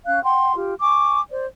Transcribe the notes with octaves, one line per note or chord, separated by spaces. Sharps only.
C#4 F5 F#6
F#5 G5 C6
F4 G4
G#5 C#6 D6
C5 D5